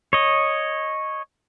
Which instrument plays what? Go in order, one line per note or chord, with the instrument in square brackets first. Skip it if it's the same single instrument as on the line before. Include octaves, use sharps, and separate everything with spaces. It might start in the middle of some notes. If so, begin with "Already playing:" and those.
[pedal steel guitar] C#5 D#5